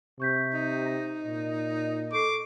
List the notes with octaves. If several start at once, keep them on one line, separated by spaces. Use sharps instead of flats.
C3 C#6 G6 B6
D#4
A#5 A#6
A#2
A4 C#6 D6 C7